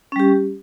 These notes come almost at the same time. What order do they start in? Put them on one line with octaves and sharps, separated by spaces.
C#4 G3 G4